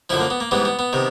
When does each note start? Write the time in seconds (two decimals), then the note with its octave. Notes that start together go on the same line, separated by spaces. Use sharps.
0.10 F#2 D3 F3 E4
0.20 A#3
0.30 B3
0.40 A#3
0.51 G#2 E3 G3 B3
0.65 B3
0.79 B3
0.93 C3 D#3